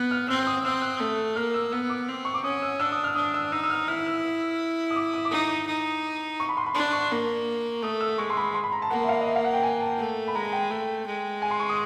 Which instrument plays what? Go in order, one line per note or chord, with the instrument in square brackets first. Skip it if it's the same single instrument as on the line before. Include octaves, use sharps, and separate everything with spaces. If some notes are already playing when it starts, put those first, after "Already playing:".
Already playing: [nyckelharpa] B3 [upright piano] F#6
[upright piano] F6
[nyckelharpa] C4 [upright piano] E6
[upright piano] D#6
[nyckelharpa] C4 [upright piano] E6
[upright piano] F#6
[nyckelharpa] A3
[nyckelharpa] A#3 [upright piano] F6
[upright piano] E6
[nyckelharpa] B3 [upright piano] E6
[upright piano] D6
[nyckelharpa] C4
[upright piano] C#6
D6
[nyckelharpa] C#4 [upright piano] D#6
[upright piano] E6
[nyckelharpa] D4 [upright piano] E6
[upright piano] D#6
F6
[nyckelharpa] D4 [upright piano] D#6
[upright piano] E6
[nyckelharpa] D#4 [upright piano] E6
[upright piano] E6
F6
[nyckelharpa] E4 [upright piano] F6
[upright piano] E6
D#6
D6
D#6
D6
[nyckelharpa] D#4 [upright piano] D#6
[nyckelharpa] D#4
[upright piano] C#6
B5
C6
B5
[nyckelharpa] D4 [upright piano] C6
[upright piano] C#6
[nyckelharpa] A#3
[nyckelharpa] A3 [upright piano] D#6
[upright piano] E6
[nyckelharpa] G#3 [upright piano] C#6
[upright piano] C6
B5
C6
B5
A#5
A5
[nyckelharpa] A#3 [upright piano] F#5
[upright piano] E5
F5
D#5
E5
F5
F#5
G5
G#5
A5
[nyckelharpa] A3
[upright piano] B5
[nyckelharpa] G#3 [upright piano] A#5
[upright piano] G5
[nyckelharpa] A3
G#3
[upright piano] G#5
C6
C#6
D#6